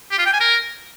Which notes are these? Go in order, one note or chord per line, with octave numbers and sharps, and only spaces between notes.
G4
F4
G5
G#5
A#4